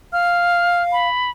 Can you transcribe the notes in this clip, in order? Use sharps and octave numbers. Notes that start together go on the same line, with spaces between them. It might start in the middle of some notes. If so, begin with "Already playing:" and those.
F5 F6
B5